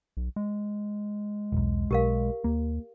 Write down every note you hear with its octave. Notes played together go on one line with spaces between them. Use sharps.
B1
G#3
E1 B1
B1 G4 A#4 F5
D#2 A#3